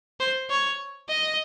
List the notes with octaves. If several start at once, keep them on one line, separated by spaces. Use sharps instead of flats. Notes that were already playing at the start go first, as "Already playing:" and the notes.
C5
C#5
D#5